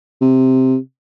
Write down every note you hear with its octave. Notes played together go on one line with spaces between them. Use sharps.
C3